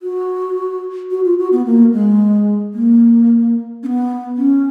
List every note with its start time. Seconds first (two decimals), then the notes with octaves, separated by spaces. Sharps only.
0.02 F#4
1.11 F#4
1.25 F4
1.39 F#4
1.52 B3
1.66 A#3
1.93 G#3
2.74 A#3
3.83 C#4
3.86 B3
4.37 C#4